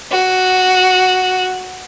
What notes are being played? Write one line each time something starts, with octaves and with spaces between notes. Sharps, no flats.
F#4